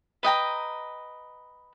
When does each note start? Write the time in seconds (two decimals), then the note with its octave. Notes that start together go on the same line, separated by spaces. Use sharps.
0.23 B4 D#5 G5 A#5